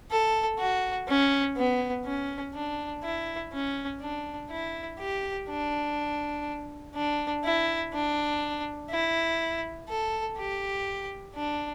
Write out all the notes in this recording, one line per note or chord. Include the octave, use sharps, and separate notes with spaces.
A4
F#4
C#4
B3
C#4
D4
E4
C#4
D4
E4
G4
D4
D4
E4
D4
E4
A4
G4
D4